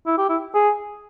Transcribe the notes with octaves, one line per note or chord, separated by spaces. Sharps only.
E4
G4
E4
G#4